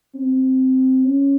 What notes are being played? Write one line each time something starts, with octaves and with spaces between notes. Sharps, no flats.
C4
C#4